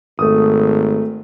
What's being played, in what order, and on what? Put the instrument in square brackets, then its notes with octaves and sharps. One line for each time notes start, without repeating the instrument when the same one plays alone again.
[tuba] G#1 [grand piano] A3 D#6